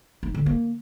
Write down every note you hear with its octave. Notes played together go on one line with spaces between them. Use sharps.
D#4
D3
A#3